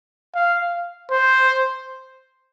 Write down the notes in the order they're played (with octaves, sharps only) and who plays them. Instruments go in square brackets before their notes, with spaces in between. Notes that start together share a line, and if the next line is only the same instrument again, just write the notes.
[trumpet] F5
C5